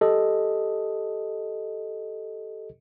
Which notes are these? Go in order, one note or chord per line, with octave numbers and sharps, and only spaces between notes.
G4 A4 D#5